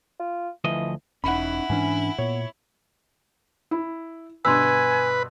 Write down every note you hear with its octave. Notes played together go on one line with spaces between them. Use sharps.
F4
D2 E3 F3 D#5
E1 C#4 D#4 E4 F#5 B5
G#2 E3 C#4 D4 G#5
A#2 B3 C#5
E4
G2 B2 D3 B4 G#5 C6 E6